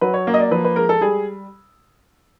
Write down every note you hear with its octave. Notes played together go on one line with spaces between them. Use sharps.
F#3 B4
C#5
A#3
D#5
D5
F3 B4
B4
G#3 A#4
A4
G3 G#4